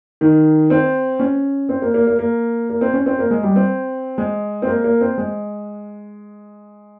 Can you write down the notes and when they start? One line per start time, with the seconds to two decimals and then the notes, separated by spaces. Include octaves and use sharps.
0.21 D#3
0.70 C4
1.20 C#4
1.69 C4
1.82 A#3
1.94 A#3
2.07 A#3
2.19 A#3
2.70 A#3
2.81 C4
2.94 C#4
3.06 C4
3.19 A#3
3.31 G#3
3.43 G3
3.56 C4
4.18 G#3
4.62 C4
4.67 A#3
4.84 A#3
5.01 C4
5.18 G#3